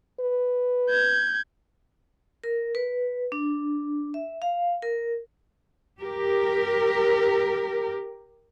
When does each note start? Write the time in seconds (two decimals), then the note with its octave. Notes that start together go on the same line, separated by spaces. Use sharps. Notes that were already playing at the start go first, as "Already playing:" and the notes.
0.20 B4
0.90 G6 G#6
2.44 A#4
2.75 B4
3.32 D4
4.14 E5
4.42 F5
4.82 A#4
6.00 G4 A#4